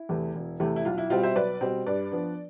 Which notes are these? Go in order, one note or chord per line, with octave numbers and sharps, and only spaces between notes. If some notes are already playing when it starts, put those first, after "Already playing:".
Already playing: E4
E2 C3 E3 A3
E1
E2 C3 E3 A3
E4
B1 F4
E4
B2 G3 C4 F4
C5 E5
B1 B4 D5
B2 G3 C4
G2 B4 D5
F3 B3 D4